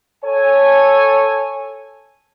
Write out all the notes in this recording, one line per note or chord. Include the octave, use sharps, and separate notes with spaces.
A4 C#5 G#5